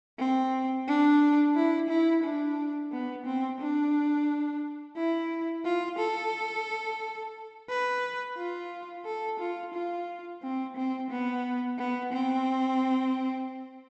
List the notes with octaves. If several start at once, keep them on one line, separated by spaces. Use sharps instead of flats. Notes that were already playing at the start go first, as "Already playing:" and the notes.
C4
D4
E4
E4
D4
B3
C4
D4
E4
F4
A4
B4
F4
A4
F4
F4
C4
C4
B3
B3
C4